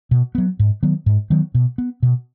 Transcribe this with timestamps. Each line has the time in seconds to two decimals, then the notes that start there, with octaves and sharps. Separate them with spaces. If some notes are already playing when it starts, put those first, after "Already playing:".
0.11 B2
0.35 F#3 B3
0.59 G#2
0.83 D#3 F#3 B3
1.06 G#2
1.30 D#3 F#3 B3
1.54 B2
1.78 B3
2.03 B2